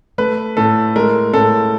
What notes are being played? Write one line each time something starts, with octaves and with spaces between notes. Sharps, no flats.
A3 B4
A2 A4
G#3 A#4
A2 A4